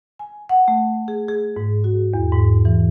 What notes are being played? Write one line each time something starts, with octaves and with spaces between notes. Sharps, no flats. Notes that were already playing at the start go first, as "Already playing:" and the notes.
G#5
F#5
A3
G#4
G#4
G#2
F#4
E2
G#2
E3